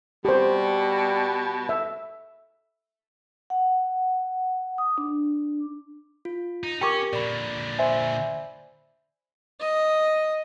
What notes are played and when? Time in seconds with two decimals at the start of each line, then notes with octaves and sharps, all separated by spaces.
0.25 B2 G3 G4 C5
1.69 E5
3.50 F#5
4.78 D#6
4.98 D4
6.25 F4
6.63 D#4
6.81 C#4 G4 A#4 G5 C#6 D6
7.13 A#2 D3 D5 B5
7.78 C5 E5 G#5
9.60 D#5